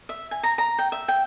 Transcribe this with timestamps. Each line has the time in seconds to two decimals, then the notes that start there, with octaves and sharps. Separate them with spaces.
0.09 E5
0.31 G#5
0.43 A#5
0.58 A#5
0.79 G5
0.92 E5
1.08 G5